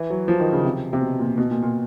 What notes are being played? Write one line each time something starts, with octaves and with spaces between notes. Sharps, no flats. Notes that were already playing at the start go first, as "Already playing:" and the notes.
Already playing: E3
F#3
F3
D#3
C#3
C3
C3
B2
A#2
B2
A#2
A#2